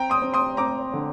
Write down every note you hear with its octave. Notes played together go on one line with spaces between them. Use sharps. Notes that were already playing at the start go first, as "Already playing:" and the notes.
Already playing: C4 G5 A#5
C6 D#6
C4
C6 D#6
C4 A#5 D6
D3